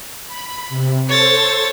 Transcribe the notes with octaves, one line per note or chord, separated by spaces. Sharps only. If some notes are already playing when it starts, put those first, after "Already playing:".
B5
C3
A4 C5 C#5 A6